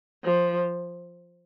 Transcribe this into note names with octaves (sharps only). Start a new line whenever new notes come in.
F3